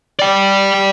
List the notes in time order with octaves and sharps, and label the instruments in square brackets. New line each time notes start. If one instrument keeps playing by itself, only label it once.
[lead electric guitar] D5 G5